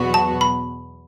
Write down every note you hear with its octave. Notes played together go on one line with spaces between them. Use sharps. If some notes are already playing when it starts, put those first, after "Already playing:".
Already playing: E2 B2 F#3 B3 F#4
A5
B5